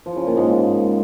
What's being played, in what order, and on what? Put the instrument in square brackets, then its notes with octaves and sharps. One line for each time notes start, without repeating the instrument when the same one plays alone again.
[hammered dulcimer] F3
C#3
A#2
G#2